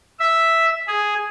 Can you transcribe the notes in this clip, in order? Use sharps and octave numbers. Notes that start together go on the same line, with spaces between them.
E5
G#4